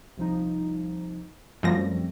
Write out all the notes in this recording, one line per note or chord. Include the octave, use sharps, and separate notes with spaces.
C2 F3 D#4
F#2 F3 G3 A3 C4 A#6